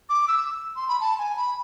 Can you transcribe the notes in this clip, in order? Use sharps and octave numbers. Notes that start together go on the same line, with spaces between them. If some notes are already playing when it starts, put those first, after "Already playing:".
D6
E6
C6
B5
A5
G#5
B5